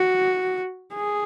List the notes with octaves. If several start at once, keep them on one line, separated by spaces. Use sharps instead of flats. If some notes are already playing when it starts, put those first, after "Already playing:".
Already playing: F#4
G#4